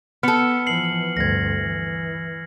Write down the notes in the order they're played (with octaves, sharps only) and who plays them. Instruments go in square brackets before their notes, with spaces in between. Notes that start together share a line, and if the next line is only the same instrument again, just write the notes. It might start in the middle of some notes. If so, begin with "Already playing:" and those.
[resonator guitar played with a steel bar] B3 A4 [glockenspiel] F6 C#7
[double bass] E3 F3 [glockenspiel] C7 F#7
[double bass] D2 G2 [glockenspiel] G#6 A#6
[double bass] E3